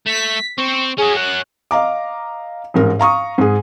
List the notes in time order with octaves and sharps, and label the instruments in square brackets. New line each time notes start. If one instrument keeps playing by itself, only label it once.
[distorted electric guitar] A3 [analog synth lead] B6
[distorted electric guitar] C4 C5 [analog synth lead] C#6
[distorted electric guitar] C#4 F#4 [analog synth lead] G#4
[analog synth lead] F#6
[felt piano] D#5 F5 A#5 D6
A1 G#2 A#4
F5 A#5 C#6 D#6
G#2 G#4